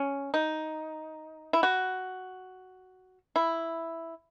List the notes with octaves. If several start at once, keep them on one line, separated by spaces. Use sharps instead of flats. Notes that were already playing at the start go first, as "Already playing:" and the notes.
Already playing: C#4
D#4
E4
F#4
E4